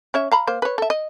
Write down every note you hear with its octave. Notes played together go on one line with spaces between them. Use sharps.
C#4 C#5 E5
F5 A#5 B5
A#3 C5
B4 C#5
A4 E5
D#5